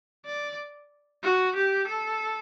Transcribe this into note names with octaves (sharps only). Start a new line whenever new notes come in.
D5
F#4
G4
A4